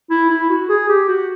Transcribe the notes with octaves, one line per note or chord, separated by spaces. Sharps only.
E4
E4
F#4
G#4
G4
F#4